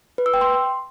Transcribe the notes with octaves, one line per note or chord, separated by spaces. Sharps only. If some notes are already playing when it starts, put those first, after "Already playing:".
B4
E6
G5
C6